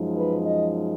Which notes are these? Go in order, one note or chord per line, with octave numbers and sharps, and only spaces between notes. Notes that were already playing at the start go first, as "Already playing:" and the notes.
Already playing: F#2 F3 G#3 D#4
B4
D#5